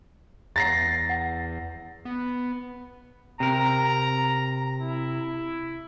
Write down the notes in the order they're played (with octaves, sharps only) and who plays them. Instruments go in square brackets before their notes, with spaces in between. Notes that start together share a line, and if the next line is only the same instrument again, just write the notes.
[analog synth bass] E2 [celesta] F#5 A#5 [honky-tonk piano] A6 A#6 C7
[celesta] F#5
[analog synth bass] B3
[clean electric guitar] C3 A#4 [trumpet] A#5
[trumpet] E4